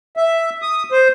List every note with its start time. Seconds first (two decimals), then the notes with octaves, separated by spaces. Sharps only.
0.17 E5
0.62 D#6
0.92 C5